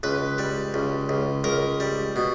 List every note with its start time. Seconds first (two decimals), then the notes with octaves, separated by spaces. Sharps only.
0.03 C#2 B4
0.38 G3
0.74 C#2
1.09 C#2
1.44 C#2 A#4
1.80 G3
2.16 B2